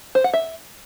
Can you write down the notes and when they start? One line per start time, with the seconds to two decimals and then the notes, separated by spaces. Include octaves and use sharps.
0.15 C5
0.24 F#5
0.33 E5